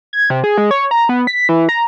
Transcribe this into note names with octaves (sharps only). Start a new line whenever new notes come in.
G#6
C3
G#4
G#3
C#5
A#5
B3
B6
E3
A#5